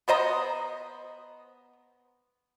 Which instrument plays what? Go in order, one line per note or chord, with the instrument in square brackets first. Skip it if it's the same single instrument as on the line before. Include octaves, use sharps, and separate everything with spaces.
[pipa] B3 C5 D#5 A#5